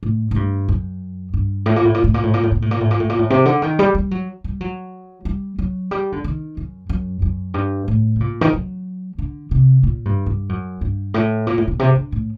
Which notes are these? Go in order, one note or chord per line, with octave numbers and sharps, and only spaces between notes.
A2
A2
G2
F#2
G2
A2
A#2
A2
A#2
A2
A#2
A2
A#2
A2
A#2
A2
A#2
A2
A#2
A2
A#2
A2
C3
D3
D#3
G3
G3
F#3
G3
F#3
G3
F#3
G3
D3
D#3
F#2
F#2
F#2
G2
A2
C3
A#2
D#3
F#3
D3
C3
A#2
G2
G2
F#2
G2
A2
A#2
A2
A#2
C3
D3
A2